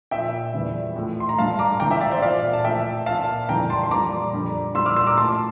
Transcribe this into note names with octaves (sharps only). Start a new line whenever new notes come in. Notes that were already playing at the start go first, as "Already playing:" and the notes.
A#2 F3 E5 G5
E2 E3 G3
A2 F3
C6
A#5
G2 F3 F5 A5
A#5 D6
G2 E3 G3 G5 A#5
E5 G5
D5 F5
C5 E5
A#2 F3 D5 F5
A5
A2 F3 E5 G5
A#2 F3 F5 A5
F2 E3 G3 G5 A#5
A5 C6
C6
A#2 G3 A#5 D6
F2 D3 G3
A#2 G3 C6 E6
D6 F6
C6 E6
A#5 D6
A2 F3 A5 C6